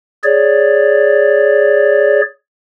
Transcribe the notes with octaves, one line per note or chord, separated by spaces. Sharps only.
G#4 C#5 D5